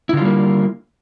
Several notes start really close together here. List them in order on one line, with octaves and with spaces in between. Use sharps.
E4 D3 F4 G3 A#3